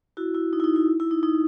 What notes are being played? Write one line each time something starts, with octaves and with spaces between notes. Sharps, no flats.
E4 F#4
E4
D#4
E4
D#4
E4
E4
D#4
D#4